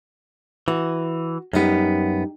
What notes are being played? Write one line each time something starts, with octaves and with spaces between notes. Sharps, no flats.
E3 F#4
F#2 G3 B3 D#4 G4